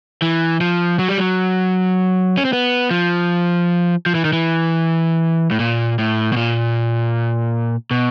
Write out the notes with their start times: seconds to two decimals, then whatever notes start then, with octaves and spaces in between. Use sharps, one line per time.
0.22 E3
0.61 F3
0.99 F#3
1.09 G3
1.18 F#3
2.37 C#4
2.45 C4
2.53 B3
2.91 F3
4.06 F3
4.15 E3
4.25 D#3
4.33 E3
5.51 A2
5.60 A#2
5.99 A2
6.33 B2
6.37 A#2
7.91 B2